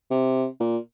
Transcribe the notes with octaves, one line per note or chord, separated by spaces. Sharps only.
C3
A#2